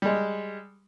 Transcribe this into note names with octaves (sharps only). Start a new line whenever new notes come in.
G3 G#3